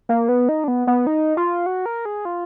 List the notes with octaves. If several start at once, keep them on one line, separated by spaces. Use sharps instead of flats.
A#3
B3
D#4
D4
B3
B3
D#4
F4
F#4
A#4
G#4
F4